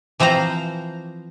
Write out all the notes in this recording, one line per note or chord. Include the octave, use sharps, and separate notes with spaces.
E3 F3 C4 C5 A#5